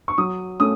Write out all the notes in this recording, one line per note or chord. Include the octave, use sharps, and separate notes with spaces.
C#6
F#3 D#6
A3 C#4 D#6